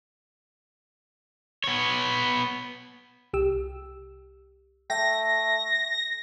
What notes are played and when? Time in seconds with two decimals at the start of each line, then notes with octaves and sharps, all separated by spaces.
1.64 B3 C#5
3.33 C2 G4 E6
4.90 A3 G5 A#6